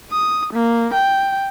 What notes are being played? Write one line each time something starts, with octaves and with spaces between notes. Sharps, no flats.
D#6
A#3
G5